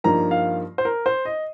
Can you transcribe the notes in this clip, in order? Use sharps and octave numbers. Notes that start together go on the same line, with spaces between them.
G2 F3 A#3 D#4 A#5
F5
C5
A#4
C5
D#5